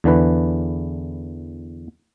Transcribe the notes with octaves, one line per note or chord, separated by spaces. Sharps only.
E2 D3 E3 B4